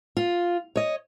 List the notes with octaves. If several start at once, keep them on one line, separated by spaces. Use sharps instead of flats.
F4
C#5 D#5